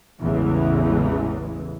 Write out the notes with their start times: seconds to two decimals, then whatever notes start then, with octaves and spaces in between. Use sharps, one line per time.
0.21 A1 E2 C#3 E3 G#3